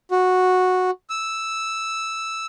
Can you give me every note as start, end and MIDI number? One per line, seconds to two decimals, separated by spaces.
0.11 0.91 66
1.10 2.46 88